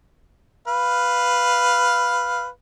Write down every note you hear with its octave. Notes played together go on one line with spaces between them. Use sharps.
B4 F5